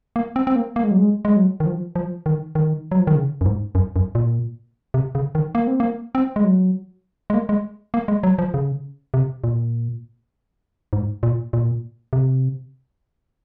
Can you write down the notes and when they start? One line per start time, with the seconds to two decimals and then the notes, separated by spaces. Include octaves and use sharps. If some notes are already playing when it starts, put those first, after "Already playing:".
0.16 A#3
0.36 C4
0.47 C4
0.56 A#3
0.76 A#3
0.84 G#3
0.91 F#3
0.98 G#3
1.25 G#3
1.36 F#3
1.60 D#3
1.66 F3
1.95 F3
2.26 D#3
2.55 D#3
2.91 F#3
3.00 F3
3.07 D#3
3.15 C#3
3.41 F#2
3.46 G#2
3.75 F#2
3.96 F#2
4.15 A#2
4.94 C3
5.15 C#3
5.35 D#3
5.55 A#3
5.67 C4
5.80 A#3
6.15 C4
6.36 G#3
6.44 F#3
7.30 G#3
7.34 A#3
7.49 G#3
7.94 A#3
8.08 G#3
8.23 F#3
8.38 F3
8.54 C#3
9.14 C3
9.44 A#2
10.93 G#2
11.23 A#2
11.53 A#2
12.13 C3